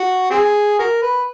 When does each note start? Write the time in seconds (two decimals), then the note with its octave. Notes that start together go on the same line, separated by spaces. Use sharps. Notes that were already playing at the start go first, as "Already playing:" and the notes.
Already playing: F#4
0.31 C4 G#4
0.79 F#4 A#4
1.02 B4